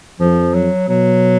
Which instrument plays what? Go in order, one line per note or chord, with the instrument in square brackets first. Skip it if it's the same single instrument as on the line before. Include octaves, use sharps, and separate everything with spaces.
[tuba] F2 [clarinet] F3
[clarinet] F#3
[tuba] B2 [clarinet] F#3